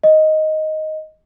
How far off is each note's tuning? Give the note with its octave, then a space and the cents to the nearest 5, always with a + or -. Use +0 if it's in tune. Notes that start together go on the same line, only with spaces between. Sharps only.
D#5 +5